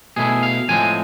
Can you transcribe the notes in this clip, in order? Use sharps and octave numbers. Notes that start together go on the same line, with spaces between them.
B2 A3 E4 G#4
F5
A2 F3 G#3 C4 G#5